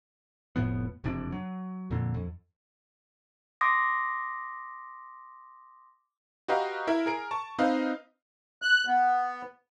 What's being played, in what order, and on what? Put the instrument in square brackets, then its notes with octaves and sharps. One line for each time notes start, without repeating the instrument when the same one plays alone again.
[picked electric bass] F1 A2 F3 B3
F#1 F2 C3 D4
F#3
F2 A#2 D3
F2
[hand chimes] C6 D6 D#6 A#6
[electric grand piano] F#4 G4 B4 D#5 F5 A#5
E4 A#4 E5
G#4 A#4 D7
A5 C#6
C4 D#4 B4 D#5 F5
[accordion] F#6
B3